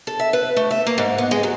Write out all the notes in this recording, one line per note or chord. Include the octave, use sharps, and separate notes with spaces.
A4
E5
B4
A3
E5
A#3
G#2
B3
G#3
F#3